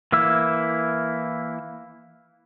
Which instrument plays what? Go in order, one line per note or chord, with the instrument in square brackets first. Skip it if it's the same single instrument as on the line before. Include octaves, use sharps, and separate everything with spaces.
[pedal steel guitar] E3 A#3 E4 E6